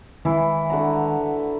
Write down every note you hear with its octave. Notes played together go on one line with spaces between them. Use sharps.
D#3 E3 G#3 E4
D3 F#4 A#5